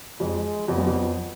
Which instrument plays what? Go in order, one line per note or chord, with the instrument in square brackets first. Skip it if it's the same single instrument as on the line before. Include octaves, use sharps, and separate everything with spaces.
[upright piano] F2 [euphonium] G#3
[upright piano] F2 [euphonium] B3
[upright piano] F#2
F2